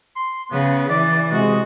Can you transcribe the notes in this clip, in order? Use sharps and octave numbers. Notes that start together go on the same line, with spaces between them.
C6
C#3 B3
E3 D5
C3 G#3 F#4 D#5